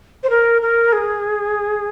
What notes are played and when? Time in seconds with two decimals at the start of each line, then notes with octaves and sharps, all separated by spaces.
0.23 C5
0.30 A#4
0.62 A#4
0.92 G#4